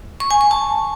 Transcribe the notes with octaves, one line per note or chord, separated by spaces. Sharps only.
C#6
G#5
C#6
A5